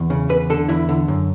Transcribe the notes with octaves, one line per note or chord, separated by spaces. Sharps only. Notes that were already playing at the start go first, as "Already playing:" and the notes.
Already playing: E2
C#3
E2 B4
D3 A4
E2 E4
D3
F#2